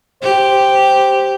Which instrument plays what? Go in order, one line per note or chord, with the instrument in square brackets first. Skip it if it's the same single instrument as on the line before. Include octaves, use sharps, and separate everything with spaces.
[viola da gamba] G4 [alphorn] C5